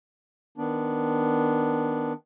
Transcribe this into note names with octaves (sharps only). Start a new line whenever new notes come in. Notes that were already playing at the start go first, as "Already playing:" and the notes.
D#3 B3 D4